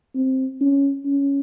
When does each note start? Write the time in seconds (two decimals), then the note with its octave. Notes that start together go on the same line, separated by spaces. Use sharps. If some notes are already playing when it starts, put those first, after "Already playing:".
0.15 C4
0.61 C#4
1.06 C#4